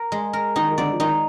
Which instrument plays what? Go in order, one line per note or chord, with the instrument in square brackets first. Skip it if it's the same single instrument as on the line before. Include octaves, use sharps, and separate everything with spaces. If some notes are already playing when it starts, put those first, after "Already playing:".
Already playing: [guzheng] A#4
G#3
A#4
[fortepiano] D#3 [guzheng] D#4
[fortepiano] D#3
[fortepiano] D3 [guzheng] D5
[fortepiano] F3
[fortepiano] D#3 [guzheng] D#4